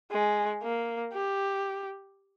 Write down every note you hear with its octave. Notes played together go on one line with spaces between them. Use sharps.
G#3
A#3
G4